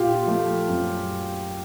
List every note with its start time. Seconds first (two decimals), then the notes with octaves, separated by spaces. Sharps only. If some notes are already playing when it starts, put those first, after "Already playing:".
Already playing: A#2 F4 G4
0.25 F3 A3
0.69 F#2